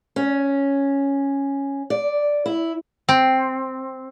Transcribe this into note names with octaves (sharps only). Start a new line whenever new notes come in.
C#4
D5
E4
C4